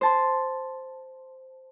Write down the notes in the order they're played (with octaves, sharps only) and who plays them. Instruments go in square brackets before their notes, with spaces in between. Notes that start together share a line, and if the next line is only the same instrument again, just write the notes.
[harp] C5 A5 C6